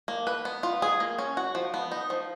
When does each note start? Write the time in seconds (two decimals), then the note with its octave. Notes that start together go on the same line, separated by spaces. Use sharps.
0.08 A#3
0.27 B4
0.45 B3
0.63 F4
0.82 G#4
1.00 A#3
1.18 C#4
1.37 F#4
1.55 F3
1.74 B3
1.92 D#4
2.10 F3